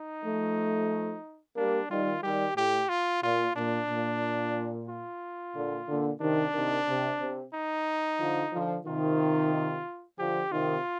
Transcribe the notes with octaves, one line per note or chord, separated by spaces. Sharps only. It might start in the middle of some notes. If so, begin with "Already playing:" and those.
Already playing: D#4
F3 A3
G3 A#3 D4
D#3 G3 F4
D#3 G3 G4
A2 G4
F4
A#2 F4
A#2 D4
A#2
F4
A#2 D3
A#2 D3
C3 D#3 D4
C3 D#3
C3
C3
D#4
D3 F3
D3 F3
C3 D#3 F4
D3 F3 G4
C3 D#3 F4